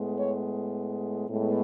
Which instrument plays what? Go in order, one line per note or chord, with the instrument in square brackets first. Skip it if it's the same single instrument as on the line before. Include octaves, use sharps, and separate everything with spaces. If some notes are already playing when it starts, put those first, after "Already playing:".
Already playing: [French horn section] A2 G#3 B3
C#5
A2 G#3 B3